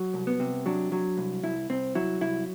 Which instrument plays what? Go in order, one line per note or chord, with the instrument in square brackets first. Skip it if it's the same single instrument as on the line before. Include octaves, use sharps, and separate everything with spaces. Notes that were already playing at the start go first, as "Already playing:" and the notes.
Already playing: [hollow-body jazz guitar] F#3
C2
B3
C3
F#3 D4
F#3
C2
C2 E4
C2 C4
F#3 E4
C2 E4